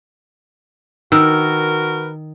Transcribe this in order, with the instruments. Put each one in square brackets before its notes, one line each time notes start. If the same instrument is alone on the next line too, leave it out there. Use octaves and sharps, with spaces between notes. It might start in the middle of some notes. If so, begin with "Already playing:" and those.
[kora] D#3 [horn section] F#4 A#4 B4 [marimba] E6